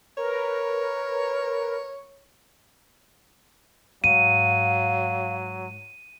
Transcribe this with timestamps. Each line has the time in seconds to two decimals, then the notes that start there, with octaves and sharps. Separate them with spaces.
0.17 A#4 B4 C#5
4.04 G#2 F#3 F5 D#7